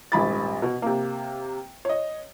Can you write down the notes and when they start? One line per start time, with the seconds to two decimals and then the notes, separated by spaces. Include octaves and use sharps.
0.12 D#1 G#1 B5 A6
0.62 B2
0.82 C3 A#3
1.85 C#5 D#5